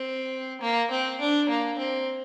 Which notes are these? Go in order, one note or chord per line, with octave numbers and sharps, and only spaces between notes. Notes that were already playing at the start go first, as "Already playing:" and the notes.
Already playing: C4
A#3
C4
D4
A#3
C4